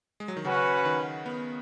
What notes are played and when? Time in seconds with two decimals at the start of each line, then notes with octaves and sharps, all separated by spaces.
0.20 G#3
0.28 F#3
0.37 D#3
0.45 C#3 C#4 F#4 B4 F#5
0.85 D#3
1.26 B3